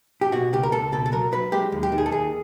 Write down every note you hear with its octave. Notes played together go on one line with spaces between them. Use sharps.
G4
B2 F#4
C#2 G4
A#4
C#2 A4
B2 A4
A4
F#3 A#4
F#3 B4
G#3 G4
D#2
G4
D#3
G#4
A4
D#2 G#4